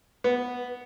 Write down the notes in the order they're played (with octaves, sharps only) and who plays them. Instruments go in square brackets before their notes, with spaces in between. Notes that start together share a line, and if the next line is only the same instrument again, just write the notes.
[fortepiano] B3